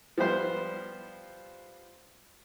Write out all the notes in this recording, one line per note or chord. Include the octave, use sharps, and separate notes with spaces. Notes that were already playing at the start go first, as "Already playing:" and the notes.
F3 G3 B3 C5 C6